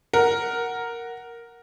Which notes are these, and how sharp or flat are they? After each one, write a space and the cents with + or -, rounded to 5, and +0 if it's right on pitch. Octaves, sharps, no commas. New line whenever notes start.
A#4 +0 F#5 +0